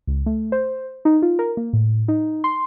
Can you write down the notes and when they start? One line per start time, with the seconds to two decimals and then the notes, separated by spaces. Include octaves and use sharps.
0.07 C#2
0.26 A3
0.52 C5
1.05 D#4
1.22 F4
1.39 A#4
1.57 A#3
1.73 A2
2.08 D#4
2.44 C6